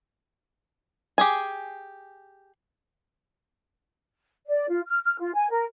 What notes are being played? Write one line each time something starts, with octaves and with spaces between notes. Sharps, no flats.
G4 G#4 G#5
D5
F4
F6
F6
F4
G#5
A#4